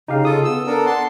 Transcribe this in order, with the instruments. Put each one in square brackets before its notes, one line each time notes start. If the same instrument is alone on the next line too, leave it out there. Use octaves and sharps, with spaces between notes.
[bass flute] C#3 [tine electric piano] D#4 G4 F5
[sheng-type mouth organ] F4 A4 [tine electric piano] D#6
[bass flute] B3 [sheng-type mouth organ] E6
[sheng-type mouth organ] D4 A4 A#4
[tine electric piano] F#5 [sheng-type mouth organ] A5 C6